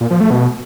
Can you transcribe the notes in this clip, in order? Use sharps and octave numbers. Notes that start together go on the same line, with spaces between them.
A#2
F3
A3
B2